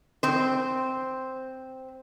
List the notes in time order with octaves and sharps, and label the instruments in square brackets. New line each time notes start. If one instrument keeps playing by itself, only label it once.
[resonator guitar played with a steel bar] C4 C5